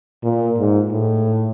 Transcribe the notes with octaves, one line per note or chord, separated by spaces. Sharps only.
A#2
G#2
A2